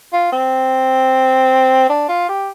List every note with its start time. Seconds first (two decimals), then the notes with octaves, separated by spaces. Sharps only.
0.13 F4
0.32 C4
1.89 D4
2.09 F4
2.29 G4